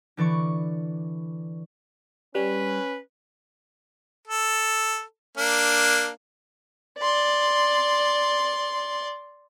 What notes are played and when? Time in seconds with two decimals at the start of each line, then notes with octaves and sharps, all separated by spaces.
0.17 D3 E3 D5 C#6
2.35 G3 C#4 B4
4.27 A4
5.37 A#3 D4
6.98 D5 C6